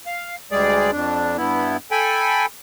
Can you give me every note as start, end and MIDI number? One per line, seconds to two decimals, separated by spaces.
0.06 0.36 77
0.51 0.91 38
0.51 0.91 55
0.51 0.91 56
0.51 0.91 68
0.51 0.91 74
0.92 1.37 41
0.92 1.37 62
1.37 1.77 43
1.37 1.77 59
1.37 1.77 64
1.91 2.46 69
1.91 2.46 79
1.91 2.46 80
1.91 2.46 83